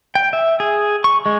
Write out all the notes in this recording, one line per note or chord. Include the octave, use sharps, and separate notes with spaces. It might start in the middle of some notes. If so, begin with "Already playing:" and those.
G5
E5
G#4
C#6
G#3